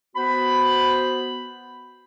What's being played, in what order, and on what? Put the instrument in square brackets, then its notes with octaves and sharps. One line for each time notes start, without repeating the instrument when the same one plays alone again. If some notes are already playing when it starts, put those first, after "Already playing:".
[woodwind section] B3 F#4 C5 B5